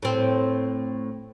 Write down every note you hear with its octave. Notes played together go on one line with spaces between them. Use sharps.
A2 C4